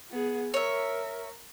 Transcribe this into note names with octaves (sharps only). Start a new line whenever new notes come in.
B3 G#4
A#4 C#5 E5